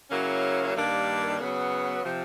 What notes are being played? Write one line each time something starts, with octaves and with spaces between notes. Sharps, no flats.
C#3 F#3 A#3 C#4 E4
G2 D#3 G3 A#3 D4
C#3 F#3 B3
C3 F3